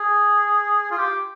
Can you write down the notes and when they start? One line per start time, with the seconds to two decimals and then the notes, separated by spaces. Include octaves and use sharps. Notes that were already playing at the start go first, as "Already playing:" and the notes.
Already playing: G#4
0.91 F4
0.98 G4